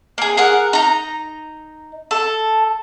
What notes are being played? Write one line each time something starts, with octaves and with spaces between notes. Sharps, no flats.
A#3 G#4
G#4 A#4 F#5
D#4 A#5
A4